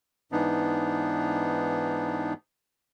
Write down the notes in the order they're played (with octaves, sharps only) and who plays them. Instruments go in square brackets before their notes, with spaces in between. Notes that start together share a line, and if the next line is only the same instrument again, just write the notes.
[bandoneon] G#2 E3 B3 D4 D#4